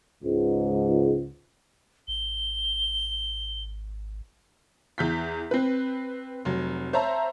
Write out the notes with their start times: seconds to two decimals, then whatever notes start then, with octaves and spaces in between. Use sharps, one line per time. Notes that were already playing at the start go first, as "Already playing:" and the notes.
0.23 C#2 G#2
2.08 G#1 G7
4.98 E2 G6 B6
5.51 C4 B4
6.45 F1 F#3
6.93 C5 C#5 E5 A5 A#5